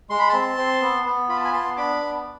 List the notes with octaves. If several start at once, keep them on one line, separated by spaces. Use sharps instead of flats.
G#3 C6
B5
C4 A5 C6
C4
B3
B3
F4 B5
A5
G#5 B5
B3 A5 C6
D4 B5 D6
B3